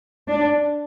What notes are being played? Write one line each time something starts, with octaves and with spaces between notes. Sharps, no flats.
D4